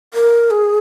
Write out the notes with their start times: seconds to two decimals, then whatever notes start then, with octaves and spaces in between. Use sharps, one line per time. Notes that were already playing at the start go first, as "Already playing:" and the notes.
0.14 A#4
0.51 G#4